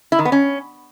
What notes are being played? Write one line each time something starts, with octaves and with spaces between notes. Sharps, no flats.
E4
D#3
B3
C#4